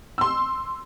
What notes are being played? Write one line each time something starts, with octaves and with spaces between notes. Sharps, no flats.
C6 E6